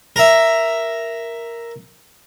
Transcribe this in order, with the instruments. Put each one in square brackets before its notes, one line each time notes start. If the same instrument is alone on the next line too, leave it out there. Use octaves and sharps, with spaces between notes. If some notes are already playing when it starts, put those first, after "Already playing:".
[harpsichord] A#4 E5